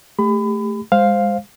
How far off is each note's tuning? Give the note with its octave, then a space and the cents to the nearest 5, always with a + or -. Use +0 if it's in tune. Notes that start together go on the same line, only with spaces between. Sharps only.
A3 +0 G4 +30 B5 +30
G#3 -20 C5 +0 F5 +0